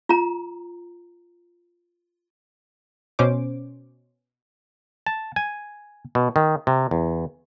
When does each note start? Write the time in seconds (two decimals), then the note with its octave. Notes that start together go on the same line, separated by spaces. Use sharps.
0.09 F4 A#5
3.19 B2 C#4 C5 D6
5.06 A5
5.36 G#5
6.15 B2
6.36 D#3
6.67 C3
6.91 E2